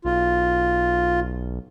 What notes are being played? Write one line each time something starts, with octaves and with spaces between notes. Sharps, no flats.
B1 F4